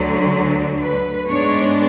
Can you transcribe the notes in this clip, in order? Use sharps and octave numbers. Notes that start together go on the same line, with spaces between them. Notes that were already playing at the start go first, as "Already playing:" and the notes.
Already playing: D2 D3 F#3
B4
G#2 G#3 B3 D4 C#5